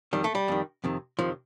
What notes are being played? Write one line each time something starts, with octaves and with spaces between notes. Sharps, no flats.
F2 D#3 G3
A3
G3
F2 D#3
F2 C3 D#3
F2 C3 D#3 F3